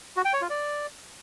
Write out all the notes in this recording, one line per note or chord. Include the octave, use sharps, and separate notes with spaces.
F#4
G5
C#5
F4
D5